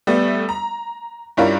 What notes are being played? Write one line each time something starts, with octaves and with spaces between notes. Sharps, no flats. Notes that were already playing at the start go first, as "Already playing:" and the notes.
G3 A3 B3
A#5
G2 G3 C#4 E4 F4 A#4